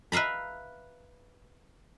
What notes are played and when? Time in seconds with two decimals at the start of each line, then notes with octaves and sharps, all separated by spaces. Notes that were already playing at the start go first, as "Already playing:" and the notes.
0.12 B4 E5 F5 A#5 B5